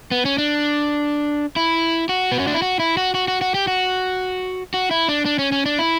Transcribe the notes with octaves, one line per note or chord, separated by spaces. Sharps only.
B3
C#4
D4
E4
F#4
B3
C#4
D4
E4
F#4
E4
F#4
F#4
F#4
F#4
G4
F#4
F#4
E4
D4
D4
C#4
C#4
D4
E4